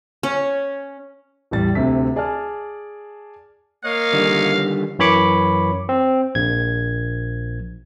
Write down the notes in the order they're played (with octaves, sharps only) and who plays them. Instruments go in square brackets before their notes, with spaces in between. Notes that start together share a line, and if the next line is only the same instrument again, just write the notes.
[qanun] C#4
[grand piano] A1 E2 G3 A6
D2 C3 B6
G#4 D5 G#5 A5 F6
[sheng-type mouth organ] A#3 C#5 D#5 [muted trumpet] F5
[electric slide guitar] D3 D#3 G3
[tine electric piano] F#2 E3 C#5 B5 D6 C#7
C4
A#1 G#6